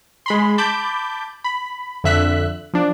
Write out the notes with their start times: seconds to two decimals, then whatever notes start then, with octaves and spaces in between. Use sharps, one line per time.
0.26 G#3 B5 C6
0.58 A5 B5 D6 G6
1.44 B5
2.04 F2 D3 E5 F#6 B6
2.74 F3 D4